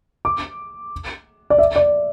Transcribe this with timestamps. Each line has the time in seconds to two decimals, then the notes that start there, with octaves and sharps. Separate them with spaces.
0.25 D6
1.50 D5
1.58 E5
1.76 D5